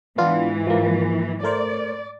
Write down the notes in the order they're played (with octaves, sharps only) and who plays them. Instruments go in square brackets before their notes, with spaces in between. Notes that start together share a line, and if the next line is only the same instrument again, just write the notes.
[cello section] G#2 E3 [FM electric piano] B3 D4 F4
[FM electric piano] F3 A#3
[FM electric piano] A3 A#4 C5 [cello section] D5